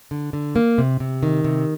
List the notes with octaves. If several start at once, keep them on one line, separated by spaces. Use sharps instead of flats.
D3
D3
A#3
C3
C3
D#3
C3